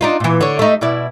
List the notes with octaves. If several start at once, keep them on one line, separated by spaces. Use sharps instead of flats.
D4 D#4 F4
A#2 E3
D3 C#5
A3 D#4
B2 E4 D5